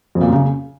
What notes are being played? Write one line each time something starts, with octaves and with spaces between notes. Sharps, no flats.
F2
A#2
F#2
C#3